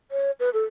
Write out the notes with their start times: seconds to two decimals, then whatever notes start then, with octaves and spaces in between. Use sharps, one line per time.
0.11 C#5
0.40 B4
0.54 A4